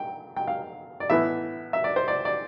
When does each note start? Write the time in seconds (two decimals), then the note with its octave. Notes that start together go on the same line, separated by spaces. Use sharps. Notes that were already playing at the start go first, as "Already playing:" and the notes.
Already playing: G5
0.37 G5
0.48 F5
1.00 D5
1.10 A2 E3 B3 E5
1.73 E5
1.84 D5
1.96 C5
2.08 D5
2.25 D5